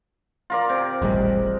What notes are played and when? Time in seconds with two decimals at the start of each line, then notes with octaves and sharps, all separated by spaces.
0.50 F4 A#4 D5
0.69 C3
1.02 D#1 A1 G3 G#3